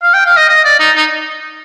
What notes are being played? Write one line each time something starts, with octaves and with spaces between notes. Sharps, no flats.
F5
G5
F5
D#5
D#5
D5
D#4
D#4